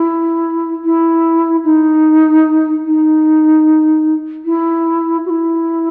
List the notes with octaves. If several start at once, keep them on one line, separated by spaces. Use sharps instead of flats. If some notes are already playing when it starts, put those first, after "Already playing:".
Already playing: E4
E4
D#4
D#4
E4
F#4
E4